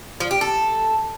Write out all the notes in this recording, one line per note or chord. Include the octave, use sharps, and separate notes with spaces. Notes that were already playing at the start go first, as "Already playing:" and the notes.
F3
G4
A4